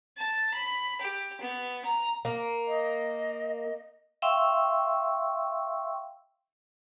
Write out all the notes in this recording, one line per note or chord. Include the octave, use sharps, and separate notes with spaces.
A5
B5
G4
B3
A#5
A#3
D#5
E5 F5 G5 C6 C#6 E6